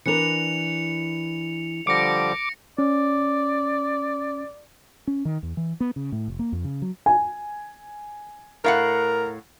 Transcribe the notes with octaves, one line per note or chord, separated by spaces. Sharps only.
E3 D4 A#4 C#7 F7
D3 F3 G3 D6 A#6 C#7
C#4 D5
C#4
D#3
E2
E3
B3
C#3
A2
F1
A#3
F2
C#3
F#3
G#5
A2 A#4 F5 F#5